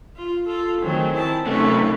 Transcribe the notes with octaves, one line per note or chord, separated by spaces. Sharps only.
F4
F4 A4
D#3 F#3 A3 C4 G#4
E4 A5
F#2 C3 D#3 A3 C#4 B4